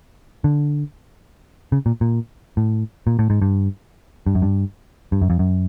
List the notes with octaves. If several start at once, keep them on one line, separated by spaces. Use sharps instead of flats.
D3
C#3
A#2
A#2
A2
A#2
A2
G#2
G2
G2
F#2
G2
G2
F#2
F2
F#2